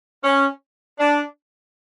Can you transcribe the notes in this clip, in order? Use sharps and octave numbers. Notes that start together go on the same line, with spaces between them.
C#4
D4